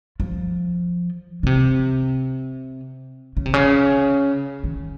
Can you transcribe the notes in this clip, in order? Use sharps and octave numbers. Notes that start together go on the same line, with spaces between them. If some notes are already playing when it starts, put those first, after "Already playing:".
F3
C#3
C3
C#3
C3
C#3
D#3